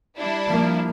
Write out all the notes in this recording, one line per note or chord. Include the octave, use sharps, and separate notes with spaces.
G3 D4 E4
F3 A#3